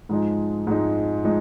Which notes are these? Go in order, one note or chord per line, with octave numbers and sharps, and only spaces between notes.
G#2 F3 G#3 D#4
G#2 F3 G#3 D#4
F3 G#3 D#4